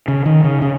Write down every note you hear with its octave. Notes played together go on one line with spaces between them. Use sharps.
C#3
D#3
C#3
C#3